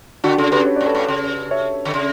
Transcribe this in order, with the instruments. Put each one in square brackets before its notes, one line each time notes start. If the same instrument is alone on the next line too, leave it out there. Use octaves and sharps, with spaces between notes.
[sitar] D3 [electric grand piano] D4 F#4
[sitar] C#3 [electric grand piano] F#4 A4
[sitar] C#3 [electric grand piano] G4 B4
[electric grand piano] C#5
[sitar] A2 [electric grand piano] D5
[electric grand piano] A4 C#5
[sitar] A2
C#3
[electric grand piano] C#5 E5
[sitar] D3
C#3